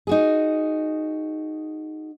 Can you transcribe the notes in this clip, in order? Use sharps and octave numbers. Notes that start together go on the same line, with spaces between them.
D#4 F#4 G#4